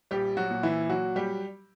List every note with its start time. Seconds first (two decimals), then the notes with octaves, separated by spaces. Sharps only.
0.11 A#1 G3 G4
0.37 F#3 F#4
0.50 A#2
0.63 E3 E4
0.89 F#3 F#4
1.16 G3 G4